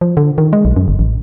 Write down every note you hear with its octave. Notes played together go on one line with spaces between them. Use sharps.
F3
D3
D#3
G#3
B1
F#2
G1
A1